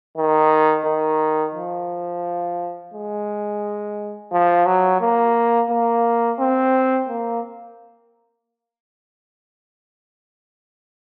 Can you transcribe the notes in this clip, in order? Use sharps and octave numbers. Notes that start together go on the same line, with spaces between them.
D#3
D#3
F3
G#3
F3
F#3
A#3
A#3
C4
A#3